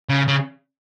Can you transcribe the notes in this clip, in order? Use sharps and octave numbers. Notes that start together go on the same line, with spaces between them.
C#3
C#3